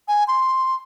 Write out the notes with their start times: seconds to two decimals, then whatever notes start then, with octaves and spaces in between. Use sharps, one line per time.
0.08 G#5
0.28 C6